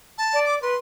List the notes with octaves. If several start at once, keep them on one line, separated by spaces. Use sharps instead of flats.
A5
D5
D6
B4 C6